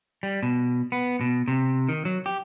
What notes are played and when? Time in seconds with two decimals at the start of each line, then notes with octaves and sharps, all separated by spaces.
0.23 G3
0.43 B2
0.92 B3
1.21 B2
1.48 C3
1.89 D#3
2.05 F#3
2.26 G4